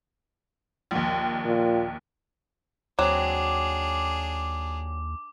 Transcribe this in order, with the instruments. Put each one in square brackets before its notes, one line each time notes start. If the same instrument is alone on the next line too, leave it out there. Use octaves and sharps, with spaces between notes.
[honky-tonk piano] A#1 D#2
[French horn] A#2
[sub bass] D#2 [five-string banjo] F#3 C4 [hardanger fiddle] D4 G#4 [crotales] D6